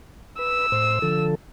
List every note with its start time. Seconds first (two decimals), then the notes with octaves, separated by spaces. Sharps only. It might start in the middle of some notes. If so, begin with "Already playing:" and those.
0.39 B4 E6
0.72 A2 C5
1.02 D3 F3 A4